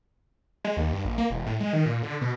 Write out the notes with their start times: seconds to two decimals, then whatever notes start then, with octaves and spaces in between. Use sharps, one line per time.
0.65 G#3
0.77 D#2
0.92 G2
1.05 A#1
1.18 A#3
1.30 E1
1.46 A2
1.60 G#3
1.73 D#3
1.86 A#2
2.02 D3
2.21 B2